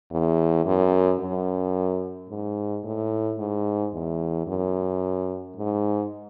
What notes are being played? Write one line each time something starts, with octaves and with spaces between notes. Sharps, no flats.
E2
F#2
F#2
G#2
A2
G#2
E2
F#2
G#2